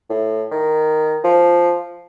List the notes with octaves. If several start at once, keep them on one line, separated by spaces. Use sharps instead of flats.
A2
D#3
F3